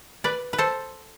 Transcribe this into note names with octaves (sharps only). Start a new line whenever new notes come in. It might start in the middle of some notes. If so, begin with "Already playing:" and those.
B4 D5
B4
A4 C5